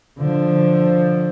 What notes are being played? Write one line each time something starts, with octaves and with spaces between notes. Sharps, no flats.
D3 F3